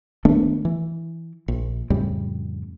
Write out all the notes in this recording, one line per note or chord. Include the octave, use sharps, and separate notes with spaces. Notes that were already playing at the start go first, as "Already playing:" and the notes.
D#3 A3 B3 D4
E3
A#1
F2 A2 C#3 G3